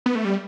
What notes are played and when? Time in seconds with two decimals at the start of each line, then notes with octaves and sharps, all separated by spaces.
0.06 B3
0.15 A3
0.25 G3